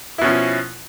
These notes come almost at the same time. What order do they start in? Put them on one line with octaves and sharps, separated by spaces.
E4 B2 C#4 F3